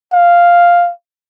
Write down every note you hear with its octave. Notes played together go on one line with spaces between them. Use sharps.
F5